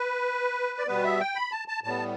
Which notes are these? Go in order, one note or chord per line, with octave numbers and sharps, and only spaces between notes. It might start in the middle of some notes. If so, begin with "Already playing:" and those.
Already playing: B4
D5
B2 G3 B3 B4
E5
G5
B5
A5
A5
A2 G3 B3 A5